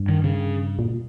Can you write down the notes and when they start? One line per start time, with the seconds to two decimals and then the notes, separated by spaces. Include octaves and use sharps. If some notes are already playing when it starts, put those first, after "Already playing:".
Already playing: G2
0.09 D#3
0.24 C#3
0.79 A#2